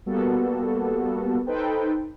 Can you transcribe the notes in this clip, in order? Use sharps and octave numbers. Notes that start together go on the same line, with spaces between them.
G3 A#3 B3 F#4 A4
D#4 A4 B4 C5 G5